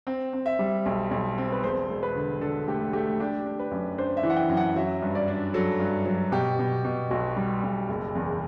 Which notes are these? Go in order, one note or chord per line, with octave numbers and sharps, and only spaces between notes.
C4
C4
E5
G3
B1
B1
C4
B4
E1 C5
E1
B4
D3
D3 A4
A3 G4
A3 G4
D4 G4
D4
B4
F#2
D4 C5
E5
E3
F#5
G5
F#2
F#5
F#3 E5
G2
D5
D4
F#3 A4
G2
F#3
B2 G4
B2
B2
B1 F#4
G3
B1
F#1
E2